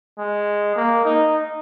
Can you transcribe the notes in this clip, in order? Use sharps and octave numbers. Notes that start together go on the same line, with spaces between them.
G#3
A#3
D#4